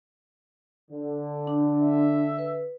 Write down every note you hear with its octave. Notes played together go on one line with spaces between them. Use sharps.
D3
D4
E5
B4